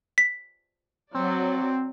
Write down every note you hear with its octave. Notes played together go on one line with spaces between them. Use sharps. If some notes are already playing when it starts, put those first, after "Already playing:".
B6
F#3 C4 D5